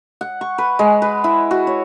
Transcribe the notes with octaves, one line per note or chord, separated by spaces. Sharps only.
F#5
C#6
B4
G#3
B4
E4
F#4
C#5